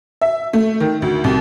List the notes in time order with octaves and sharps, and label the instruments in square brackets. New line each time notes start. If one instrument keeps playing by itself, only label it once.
[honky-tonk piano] E5
A3
D#3
D2
C2